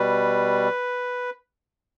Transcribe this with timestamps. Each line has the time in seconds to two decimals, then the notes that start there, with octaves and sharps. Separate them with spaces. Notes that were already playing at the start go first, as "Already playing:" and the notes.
Already playing: B2 G3 B4